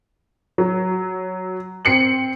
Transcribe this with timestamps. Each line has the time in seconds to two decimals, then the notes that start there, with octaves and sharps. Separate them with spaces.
0.58 F#3
1.85 C4 C7 C#7 F#7